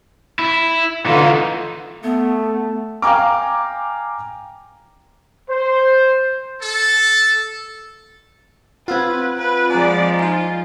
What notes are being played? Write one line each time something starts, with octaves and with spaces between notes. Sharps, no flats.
E4
D3 E3 D#4 F4
A3 B3
F5 G5 G#5 A#5 D6
C5
A4
C4 F4 B4 F#5 E6 G#6
B4
F3 G#3 D5 G#5 A#5
D#4 F4 C5 G#5